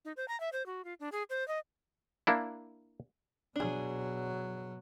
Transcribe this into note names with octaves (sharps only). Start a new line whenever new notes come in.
D#4
C5
A#5
E5
C5
F#4
F4
D4
G#4
C5
D#5
A#3 D4 E4
B2 F#3 D4 G#4